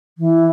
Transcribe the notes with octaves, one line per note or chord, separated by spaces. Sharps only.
E3